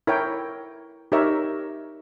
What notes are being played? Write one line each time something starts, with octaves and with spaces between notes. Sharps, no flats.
E4 A#4 C#5 G5
D#4 G4 A#4 C#5 E5